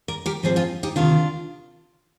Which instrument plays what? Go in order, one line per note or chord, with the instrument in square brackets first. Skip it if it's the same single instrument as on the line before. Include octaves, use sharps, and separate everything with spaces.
[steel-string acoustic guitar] A#4 D5
G4 A#4
G#2 F3 C4 G#4 C5
F4 G#4
D#4 G4
D2 C3 D#3 D4 F4